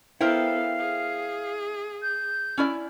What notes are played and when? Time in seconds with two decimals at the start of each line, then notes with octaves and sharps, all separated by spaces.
0.21 B3 E4 A4 A#4 C5 F5 G5
0.79 G#4
2.02 G6
2.58 C#4 E4 D5